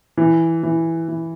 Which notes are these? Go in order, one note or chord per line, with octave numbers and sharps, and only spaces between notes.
E3
E3
E3